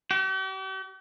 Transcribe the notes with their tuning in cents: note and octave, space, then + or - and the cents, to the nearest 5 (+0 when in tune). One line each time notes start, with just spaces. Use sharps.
G4 -45